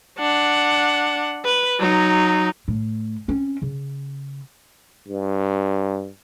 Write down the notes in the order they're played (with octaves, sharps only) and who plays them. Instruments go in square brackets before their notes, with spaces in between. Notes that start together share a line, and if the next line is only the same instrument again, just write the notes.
[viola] D4 F#5
B4
F#3 D#4
[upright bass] A2
C4 C#4
C#3
[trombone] G2